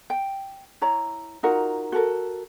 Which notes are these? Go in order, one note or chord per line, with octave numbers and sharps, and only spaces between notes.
G5
E4 C#5 A#5
D#4 F4 F#4 A#4
F#4 A4 A#4